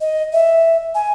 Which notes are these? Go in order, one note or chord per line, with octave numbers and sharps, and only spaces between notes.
D#5
E5
G#5